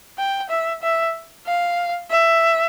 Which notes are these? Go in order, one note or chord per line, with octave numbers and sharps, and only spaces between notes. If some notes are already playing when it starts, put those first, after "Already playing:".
G5
E5
E5
F5
E5